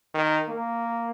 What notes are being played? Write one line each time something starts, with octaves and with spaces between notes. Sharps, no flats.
D#3
A#3